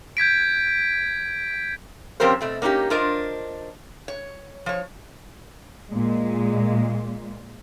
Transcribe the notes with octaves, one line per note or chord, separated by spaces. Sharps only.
G6 G#6 B6 D7
F3 C4 C#4 G4 A#4 C5
B2 A3 C4
A#3 C#4 D#4 E4 G4
D4 F4 A#4 C5 D#5
C#5
F3 C#5
A#2 G#3